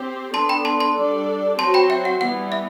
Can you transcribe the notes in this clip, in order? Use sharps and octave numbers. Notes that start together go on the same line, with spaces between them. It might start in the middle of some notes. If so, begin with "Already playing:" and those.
Already playing: C4 G4 C5
B3 D4 A4 A5 C6
G5 B5
A5 C6
A5 C6
G3 D4 A4 D5
F#3 C4 F#4 C5 A5 C6
G5 B5
E5 G5
F#5
E3 G3 B3 E4 F#5
E5